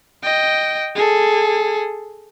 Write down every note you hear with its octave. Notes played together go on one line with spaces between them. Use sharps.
D#5 G5
G#4 A4